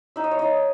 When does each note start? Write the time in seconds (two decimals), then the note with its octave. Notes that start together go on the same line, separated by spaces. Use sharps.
0.16 D#4 E5
0.24 D#5
0.31 C#5
0.39 D#4 D#5